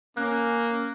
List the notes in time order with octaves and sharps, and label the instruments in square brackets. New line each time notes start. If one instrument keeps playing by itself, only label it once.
[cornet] A#3 [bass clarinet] C#4 [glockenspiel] F#6